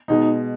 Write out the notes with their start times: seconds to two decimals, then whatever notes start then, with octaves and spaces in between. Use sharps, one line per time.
0.08 B2 G#3 D#4